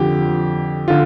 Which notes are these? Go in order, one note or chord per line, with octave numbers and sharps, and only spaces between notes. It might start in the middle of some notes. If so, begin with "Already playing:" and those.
Already playing: F2 D3 G4
D3 F4